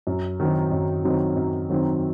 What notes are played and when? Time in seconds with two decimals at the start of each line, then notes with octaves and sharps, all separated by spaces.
0.07 F#2
0.40 D#3 F#3 C4 D#4
0.72 F#2
1.04 D#3 F#3 C4 D#4
1.37 F#2
1.70 D#3 F#3 C4 D#4